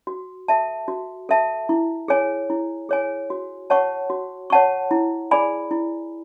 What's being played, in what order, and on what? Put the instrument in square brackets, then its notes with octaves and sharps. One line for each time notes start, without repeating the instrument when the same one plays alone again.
[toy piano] F#4
A4 E5 A5
F#4
A4 E5 A5
E4
G#4 C#5 G#5
E4
G#4 C#5 G#5
F#4
C#5 F#5 A5 C#6
F#4
C#5 F#5 A5 C#6
E4
G#4 D5 G#5 B5
E4